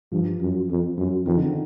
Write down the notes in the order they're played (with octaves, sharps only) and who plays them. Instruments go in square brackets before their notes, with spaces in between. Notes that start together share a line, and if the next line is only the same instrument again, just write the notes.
[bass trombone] G2 [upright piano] F3
[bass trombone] F#2
F2
F#2
[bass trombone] F2 [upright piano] D#3
[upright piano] D3
D#3